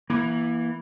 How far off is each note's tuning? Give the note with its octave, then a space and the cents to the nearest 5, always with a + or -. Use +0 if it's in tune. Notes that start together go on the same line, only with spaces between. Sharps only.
E3 +0 A#3 +30